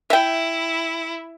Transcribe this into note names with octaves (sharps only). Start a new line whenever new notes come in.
E4 E5 G5